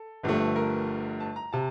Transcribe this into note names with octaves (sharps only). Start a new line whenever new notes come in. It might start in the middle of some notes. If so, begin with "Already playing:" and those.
Already playing: A4
G1 G2 F3 A3
A#4
A5
A#5
C3 A5